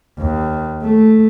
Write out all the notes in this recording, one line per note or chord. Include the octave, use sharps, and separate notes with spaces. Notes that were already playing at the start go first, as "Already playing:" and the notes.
D#2
A3